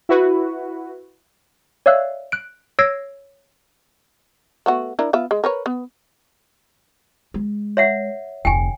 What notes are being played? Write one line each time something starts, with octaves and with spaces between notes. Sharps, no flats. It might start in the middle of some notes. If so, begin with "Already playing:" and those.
E4 F#4 B4
C#5 D5 E5 F5 E6 F#6
F#6 D7
C#5 E6 G#6 A#6 C7 D7
A3 B3 F#4
D4 E4 A#4
B3 F4 E5
G#3
A#4 B4 C#5
B3
G#3
C#5 E5 F#5
F1 D2 G5 G#5